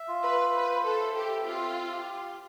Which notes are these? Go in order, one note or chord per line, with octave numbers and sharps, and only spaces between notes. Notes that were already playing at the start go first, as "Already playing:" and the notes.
Already playing: E5
F4
B4
B4 C5
A4
E5
G4
C4 F4
G4